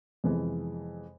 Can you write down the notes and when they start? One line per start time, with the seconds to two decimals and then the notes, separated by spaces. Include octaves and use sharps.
0.24 F2 C3 E3 G#3 B3